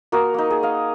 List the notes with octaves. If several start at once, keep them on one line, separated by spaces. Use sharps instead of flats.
A#3 F#4 A#4 D#6
A#3 D#4
G#4
D#5 F5